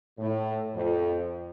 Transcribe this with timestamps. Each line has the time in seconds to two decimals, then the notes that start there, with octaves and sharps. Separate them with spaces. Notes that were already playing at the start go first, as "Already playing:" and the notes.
0.18 A2
0.75 F2